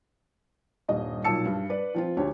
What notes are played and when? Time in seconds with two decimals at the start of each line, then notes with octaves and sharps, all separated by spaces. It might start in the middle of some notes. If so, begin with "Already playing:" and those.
0.88 D#1 G2 D#5
1.24 B1 A#2 A5 E6 C#7
1.45 G2
1.70 B4 D5
1.94 F3 C4 F4
2.17 D2 D4 G4 C#5